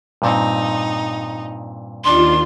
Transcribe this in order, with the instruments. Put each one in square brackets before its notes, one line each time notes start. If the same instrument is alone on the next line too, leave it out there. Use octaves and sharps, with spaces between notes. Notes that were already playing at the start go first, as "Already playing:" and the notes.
[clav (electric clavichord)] G2 A#2 C4 [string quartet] D#4
[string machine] D#2 F4 [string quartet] D#3 D4 [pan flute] C6